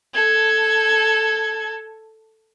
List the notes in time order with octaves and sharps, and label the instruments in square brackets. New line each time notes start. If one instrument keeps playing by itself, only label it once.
[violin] A4 G#6